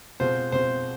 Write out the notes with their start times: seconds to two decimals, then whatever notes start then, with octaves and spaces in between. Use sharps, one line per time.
0.20 B2 G#3 C4 F4 C5
0.52 B2 G#3 C4 F4 C5